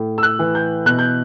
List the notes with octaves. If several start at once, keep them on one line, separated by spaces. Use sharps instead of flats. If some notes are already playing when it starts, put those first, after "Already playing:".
Already playing: A2
E6
F#6
E3
G6
B2 F#6
G6